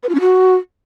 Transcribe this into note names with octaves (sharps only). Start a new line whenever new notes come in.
B4
F4
C#4
F#4